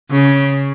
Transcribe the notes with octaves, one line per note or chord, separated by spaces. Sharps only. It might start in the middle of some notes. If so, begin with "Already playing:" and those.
C#3